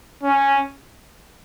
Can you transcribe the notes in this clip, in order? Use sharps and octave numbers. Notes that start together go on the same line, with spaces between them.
C#4